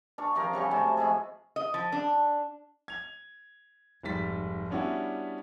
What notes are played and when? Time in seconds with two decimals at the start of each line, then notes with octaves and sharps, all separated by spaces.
0.18 D4 F5 C#6
0.35 C3 F3 C4 A#4
0.53 C#3 G3 C#4 F#4
0.71 A2 C3 F#3 A5
0.97 F3 G#3 E4 G#4
1.56 D#5
1.74 F3
1.92 D4
2.88 G#6 F7
4.03 F1 G#2 G3 A6 B6
4.70 G3 B3 C#4 D4 E4 F#4